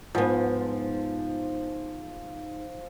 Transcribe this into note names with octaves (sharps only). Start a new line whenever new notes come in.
G#2 F3 B3